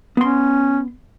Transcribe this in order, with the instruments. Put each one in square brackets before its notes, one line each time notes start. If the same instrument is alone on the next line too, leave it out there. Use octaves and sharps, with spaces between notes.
[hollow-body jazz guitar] B3 C6 [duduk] C#4